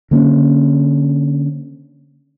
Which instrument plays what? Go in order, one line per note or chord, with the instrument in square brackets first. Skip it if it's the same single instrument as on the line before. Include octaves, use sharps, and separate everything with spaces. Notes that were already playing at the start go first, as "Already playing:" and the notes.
[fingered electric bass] D3 A#3 C4 C#4